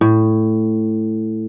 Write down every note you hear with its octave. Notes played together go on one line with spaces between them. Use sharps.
A2